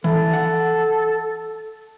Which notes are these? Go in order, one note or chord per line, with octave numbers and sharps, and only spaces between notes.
E3 A4
F#5